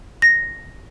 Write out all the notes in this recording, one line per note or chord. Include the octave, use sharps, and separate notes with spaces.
A#6